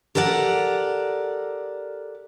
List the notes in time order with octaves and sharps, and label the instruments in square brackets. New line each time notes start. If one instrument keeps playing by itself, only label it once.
[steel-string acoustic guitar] G4 A4 A#4 D5 F#5